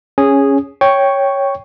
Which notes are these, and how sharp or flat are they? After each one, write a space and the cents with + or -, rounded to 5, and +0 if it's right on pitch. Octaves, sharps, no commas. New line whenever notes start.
C#4 +0 G#4 -10
C#5 +0 G5 +0 C#6 +0